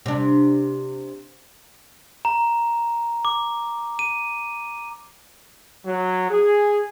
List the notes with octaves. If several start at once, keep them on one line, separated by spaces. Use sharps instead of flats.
C3 D4
A#5
D6
D#7
F#3
G#4